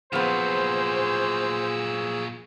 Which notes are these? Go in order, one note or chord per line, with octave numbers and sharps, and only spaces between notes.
A#2 F3 F#3 B3 G#4 C5 E6